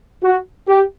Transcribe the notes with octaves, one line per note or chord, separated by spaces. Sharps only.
F#4
G4